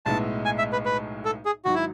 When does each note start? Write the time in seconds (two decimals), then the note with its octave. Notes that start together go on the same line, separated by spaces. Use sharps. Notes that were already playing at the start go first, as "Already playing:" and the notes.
0.06 B1 A2 G#3 B3 E4 A5
0.45 G#5
0.58 E5
0.73 B4
0.85 B4
1.25 A4
1.45 G#4
1.65 G#1 G#2 F#3 F#4
1.75 E4